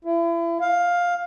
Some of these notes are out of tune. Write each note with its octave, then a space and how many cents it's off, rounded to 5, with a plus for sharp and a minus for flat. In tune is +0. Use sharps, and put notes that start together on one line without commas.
E4 +35
F5 +10